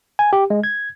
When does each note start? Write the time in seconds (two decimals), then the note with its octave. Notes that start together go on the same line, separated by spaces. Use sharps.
0.19 G#5
0.33 G4
0.50 G#3
0.64 G#6